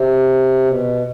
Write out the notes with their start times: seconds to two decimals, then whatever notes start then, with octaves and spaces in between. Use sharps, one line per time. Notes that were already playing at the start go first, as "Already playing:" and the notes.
Already playing: C3
0.65 B2